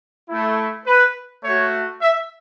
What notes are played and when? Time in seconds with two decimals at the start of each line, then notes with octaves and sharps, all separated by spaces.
0.28 A3 E4
0.86 B4
1.43 A3 F#4 C#5
2.01 E5